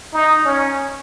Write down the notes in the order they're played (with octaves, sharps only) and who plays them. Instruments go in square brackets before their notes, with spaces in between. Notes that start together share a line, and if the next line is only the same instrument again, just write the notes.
[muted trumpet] D#4
C#4